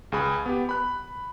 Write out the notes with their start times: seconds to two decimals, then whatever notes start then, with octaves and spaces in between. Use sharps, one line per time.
0.12 C#2 G#4 B5
0.46 B3 G4
0.69 B5 F#6